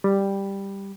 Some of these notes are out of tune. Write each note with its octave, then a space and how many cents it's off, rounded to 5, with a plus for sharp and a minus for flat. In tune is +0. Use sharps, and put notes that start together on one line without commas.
G3 +5